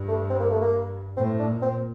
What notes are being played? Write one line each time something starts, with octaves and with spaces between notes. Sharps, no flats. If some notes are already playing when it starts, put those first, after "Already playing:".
Already playing: G2
A3
C4
A#3
A3
A#3
A2 C4
D4
A#2
C4